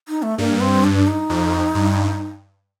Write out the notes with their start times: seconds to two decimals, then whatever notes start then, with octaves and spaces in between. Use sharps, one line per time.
0.08 D#4
0.22 A3
0.38 G2 A#3
0.61 C4
0.84 D4
1.07 D#4
1.29 F2
1.75 G2